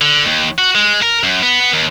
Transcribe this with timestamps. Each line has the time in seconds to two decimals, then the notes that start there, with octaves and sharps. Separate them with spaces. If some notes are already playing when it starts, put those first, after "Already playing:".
0.01 D3
0.25 D#2
0.58 F#4
0.75 G#3
1.02 A#4
1.23 F#2
1.42 B3
1.73 D#2